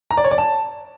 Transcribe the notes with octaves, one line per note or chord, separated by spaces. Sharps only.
A#5
D5
C#5
D5
A5